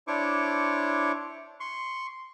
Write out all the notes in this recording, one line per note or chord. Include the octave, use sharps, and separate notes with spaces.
D4 E4 C5 C#5 C#6 D6
C6 C#6